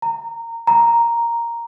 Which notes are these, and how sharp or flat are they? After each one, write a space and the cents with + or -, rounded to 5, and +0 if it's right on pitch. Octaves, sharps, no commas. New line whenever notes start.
A#5 -20
A#5 +0